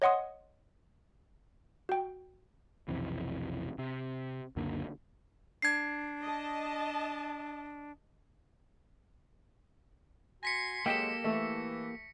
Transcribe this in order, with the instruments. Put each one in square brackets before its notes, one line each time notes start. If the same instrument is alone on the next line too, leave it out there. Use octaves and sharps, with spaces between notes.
[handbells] C#5 D#5 F#5 C6 D#6
F#4 G5
[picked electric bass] B1 F2 C3 E3
C3
C#2 F#2 D3 A#3
[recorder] D4 [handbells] G#6 C7
[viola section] D#5 A5
[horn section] F#4 G#5 C6 [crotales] A#6 B6 C#7
[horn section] F#3 G#3 [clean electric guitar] A#3 G4 A4 [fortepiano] G5
[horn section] E3 [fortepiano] A3